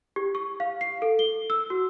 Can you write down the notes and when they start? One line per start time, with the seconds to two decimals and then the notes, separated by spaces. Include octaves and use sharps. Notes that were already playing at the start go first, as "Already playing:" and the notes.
0.16 G4
0.35 C#6
0.60 F5
0.81 C7
1.02 A4
1.19 G7
1.50 E6
1.70 F#4